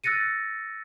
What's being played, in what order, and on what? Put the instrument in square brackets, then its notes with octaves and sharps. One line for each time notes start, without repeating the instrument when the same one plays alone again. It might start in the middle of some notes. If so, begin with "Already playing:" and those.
[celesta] E6 F#6 A6 A#6 C#7 D#7